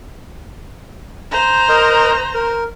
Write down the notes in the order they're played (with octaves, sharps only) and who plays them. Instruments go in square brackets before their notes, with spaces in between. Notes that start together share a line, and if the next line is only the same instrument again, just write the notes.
[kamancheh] C5 A#5
[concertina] A#4 D#5
A#4